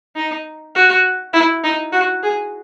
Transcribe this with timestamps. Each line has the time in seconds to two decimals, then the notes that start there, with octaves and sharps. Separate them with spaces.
0.16 D#4
0.75 F#4
1.33 E4
1.64 D#4
1.93 F#4
2.23 G#4